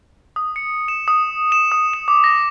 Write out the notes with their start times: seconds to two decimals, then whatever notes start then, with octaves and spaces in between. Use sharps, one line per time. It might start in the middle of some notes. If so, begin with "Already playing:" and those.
0.36 D#6
0.56 C#7
0.88 E7
1.08 D#6
1.52 E7
1.72 D#6
1.94 E7
2.08 D6
2.24 A#6